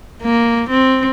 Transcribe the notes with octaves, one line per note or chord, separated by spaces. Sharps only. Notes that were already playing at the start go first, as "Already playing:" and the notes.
A#3
C4